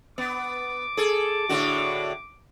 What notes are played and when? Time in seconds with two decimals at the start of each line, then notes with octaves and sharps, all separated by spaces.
0.18 B3 D6
0.97 G#4 A4
1.49 A2 D3 F#4